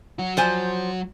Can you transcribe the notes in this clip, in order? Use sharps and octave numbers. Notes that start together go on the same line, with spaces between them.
F#3 F#4
F3 C5 G#5